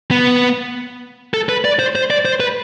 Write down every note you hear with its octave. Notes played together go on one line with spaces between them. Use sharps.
B3
A4
B4
D5
C5
C5
D5
C5
B4